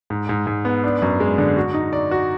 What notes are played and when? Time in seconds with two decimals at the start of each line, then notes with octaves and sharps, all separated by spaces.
0.10 G#2
0.29 G#2
0.47 G#2
0.65 B3
0.84 D4
1.02 F#2
1.20 G#3
1.38 D3
1.57 F#4
1.74 D#4
1.93 D5
2.11 F#4